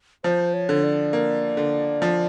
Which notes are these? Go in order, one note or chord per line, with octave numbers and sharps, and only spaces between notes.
F3 C5
C#5
D3
D5
A#3
D3
F3